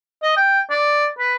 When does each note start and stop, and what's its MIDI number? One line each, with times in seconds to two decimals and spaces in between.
0.23 0.33 75
0.37 0.61 79
0.70 1.06 74
1.19 1.35 71